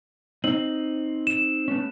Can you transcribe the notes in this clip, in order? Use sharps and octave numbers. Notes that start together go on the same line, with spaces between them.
C4 D#4 F#7
E7
A3 B3 C#4